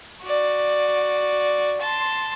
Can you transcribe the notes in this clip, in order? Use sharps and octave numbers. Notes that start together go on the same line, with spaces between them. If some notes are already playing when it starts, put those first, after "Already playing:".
F#4 D5
A5 C6